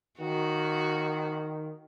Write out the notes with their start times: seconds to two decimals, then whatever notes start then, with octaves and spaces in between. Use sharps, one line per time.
0.20 D#3 F#4